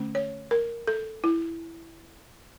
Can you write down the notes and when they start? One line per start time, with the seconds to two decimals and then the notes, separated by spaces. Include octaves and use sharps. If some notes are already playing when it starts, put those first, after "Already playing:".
Already playing: D3 A3 C#4
0.15 C#5
0.51 A#4
0.88 A4
1.24 E4